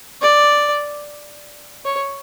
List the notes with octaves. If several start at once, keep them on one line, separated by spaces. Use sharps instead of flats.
D5
C#5